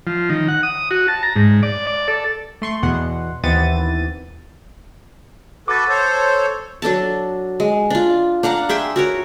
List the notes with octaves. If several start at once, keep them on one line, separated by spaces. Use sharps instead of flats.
F3
D#3
F#5
D#6
F#4
A5
A#5
G#2
D5
D5
A4
A3 C6 C#6
E2 B2 F#5 C6
D#2 E3 B3 C4 A6 D#7
F#4 A4 B4 D6 A6
A4 C5 C#5
F#3 D4 A4 A5
G#3
D4 F4
D4 F5 F#5 A#5
G#4 E5 G5 C6
F#4 A#4 C#5